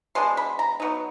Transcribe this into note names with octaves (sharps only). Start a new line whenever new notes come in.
B2 G#3 B3 D4 C6
B5
A#5
F#3 B3 D#4